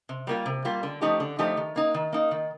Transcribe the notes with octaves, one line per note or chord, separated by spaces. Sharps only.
C3
G3 A#3 F4
C3
G3 A#3 F4
D3
F3 A3 D#4 G4
D3
F3 A3 D#4 G4
D#3
A#3 D#4
D#3
A#3 D#4
D#3